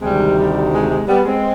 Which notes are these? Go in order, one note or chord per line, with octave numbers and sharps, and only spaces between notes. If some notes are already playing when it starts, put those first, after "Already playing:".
D2 C3 D#3 G3 G#3
G3
G#3
G#3
G3 B3
G#3 C4